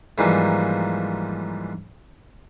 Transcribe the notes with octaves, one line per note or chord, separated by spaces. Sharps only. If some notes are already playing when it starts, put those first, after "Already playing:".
G#2 E3 F3 G3 A#3